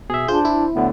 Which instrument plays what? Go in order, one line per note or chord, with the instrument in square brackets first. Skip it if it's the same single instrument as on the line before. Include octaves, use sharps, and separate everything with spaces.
[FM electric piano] B2 [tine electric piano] G#4 E5
[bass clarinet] D4 [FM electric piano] F4 G#4 G6 [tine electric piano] C5
[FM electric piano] E4
[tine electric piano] D2 A2 D3 [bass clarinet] B3